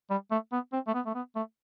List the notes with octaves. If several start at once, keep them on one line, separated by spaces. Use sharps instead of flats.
G3
A3
B3
C4
A3
B3
A3
B3
A3